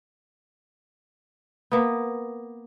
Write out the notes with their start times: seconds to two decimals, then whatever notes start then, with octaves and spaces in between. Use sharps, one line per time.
1.72 A#3 B3